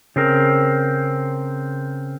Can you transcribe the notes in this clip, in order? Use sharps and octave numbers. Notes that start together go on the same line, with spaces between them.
C#3 C4 A#4